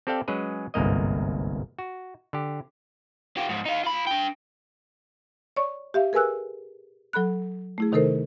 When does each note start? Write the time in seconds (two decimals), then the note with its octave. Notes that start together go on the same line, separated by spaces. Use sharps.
0.07 C4 G4 A4 D5 F5 G5
0.28 F#3 G#3 C#4 G#4 B4
0.74 G1 C2 G#2 A#3 D#5
1.79 F#4
2.33 D3 G4
3.37 F4 G4
3.49 G#2 F3
3.65 D#4 F5
3.83 F4 B5
4.07 D4 G5
5.56 C#5 D5 C#6
5.94 G4 E5 F5
6.13 G#4 A#4 B4 G#5 E6 F#6
7.13 F#3 A4 B5 F#6
7.78 A3 E4 G#4
7.92 C3 D#3 D#4 A4 A#4 C5